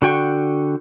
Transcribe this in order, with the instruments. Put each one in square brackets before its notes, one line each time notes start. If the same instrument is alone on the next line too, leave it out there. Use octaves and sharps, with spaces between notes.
[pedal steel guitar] D3 F#4 G5 C#6